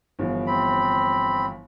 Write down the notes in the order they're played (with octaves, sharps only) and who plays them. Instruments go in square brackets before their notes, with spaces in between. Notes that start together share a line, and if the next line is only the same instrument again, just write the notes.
[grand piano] G1 E3 F3
[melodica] C4 B5